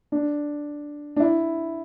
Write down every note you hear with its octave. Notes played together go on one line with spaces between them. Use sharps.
D4
D4
E4